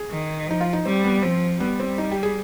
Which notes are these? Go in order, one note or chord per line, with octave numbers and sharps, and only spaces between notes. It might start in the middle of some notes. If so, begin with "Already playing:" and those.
Already playing: G#4
D#3
F3 D#4
F4
D#4
G3 C4
B3
F3 C4
G3 B3
C4
D#4
G4
G#4